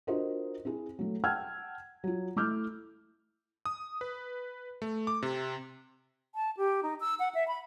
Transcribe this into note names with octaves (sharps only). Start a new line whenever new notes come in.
D4 F4 F#4 A#4 C5 D#5
C4 E4 G#4
F#3 A3
F#5 G5 A5 E6 F6 G#6
F#3 F4
A3 E4 D6 E6 F6 G6
D#6
B4
A3
D6
C3
A5
G4
D#4
E6
F#5
E5
B5